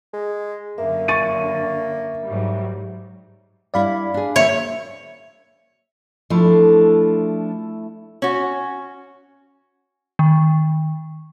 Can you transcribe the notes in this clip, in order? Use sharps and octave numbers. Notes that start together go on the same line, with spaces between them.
G#3
F#2 D3 A#3 E5
C#6 A6 D#7
G#2 F#3 G3
G2 G3 E4 D5 F5 B5
D4 G#4
F#3 A#3 C#5 E5
F3 A3 D4 E4 A4
C#4 F#4
D#3